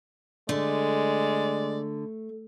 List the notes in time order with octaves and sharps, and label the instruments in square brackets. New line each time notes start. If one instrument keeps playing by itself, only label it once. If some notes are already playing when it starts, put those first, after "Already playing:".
[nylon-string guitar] D3 [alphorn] G#3 [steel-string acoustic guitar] A3 [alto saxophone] D5